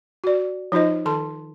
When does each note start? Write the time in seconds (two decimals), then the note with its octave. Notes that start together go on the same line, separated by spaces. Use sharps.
0.24 F#4 D5
0.72 F3 D#4 F4 C5 D#5
1.06 D#3 A4 A5 C6